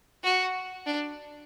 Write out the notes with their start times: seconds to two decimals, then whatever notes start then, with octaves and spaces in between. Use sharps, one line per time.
0.23 F#4
0.86 D4